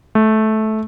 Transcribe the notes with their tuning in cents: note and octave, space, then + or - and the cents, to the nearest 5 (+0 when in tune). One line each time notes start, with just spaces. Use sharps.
A3 -15